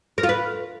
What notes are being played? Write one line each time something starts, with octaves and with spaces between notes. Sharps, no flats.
A#4
F4
B4